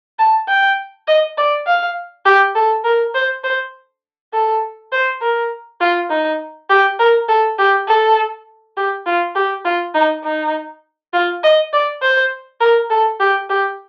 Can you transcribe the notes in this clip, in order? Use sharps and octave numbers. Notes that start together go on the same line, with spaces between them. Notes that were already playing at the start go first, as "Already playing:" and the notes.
A5
G5
D#5
D5
F5
G4
A4
A#4
C5
C5
A4
C5
A#4
F4
D#4
G4
A#4
A4
G4
A4
G4
F4
G4
F4
D#4
D#4
F4
D#5
D5
C5
A#4
A4
G4
G4